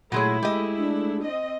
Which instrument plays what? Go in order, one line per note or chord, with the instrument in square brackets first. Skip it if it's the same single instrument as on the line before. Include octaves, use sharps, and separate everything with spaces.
[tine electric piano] A#2 C#5 [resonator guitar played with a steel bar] F#3 G#3 G#4 [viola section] A3 E4 [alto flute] B5
[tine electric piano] G#3 G#4 [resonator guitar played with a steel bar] G4 D#5
[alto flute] D4
[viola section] C4 D#5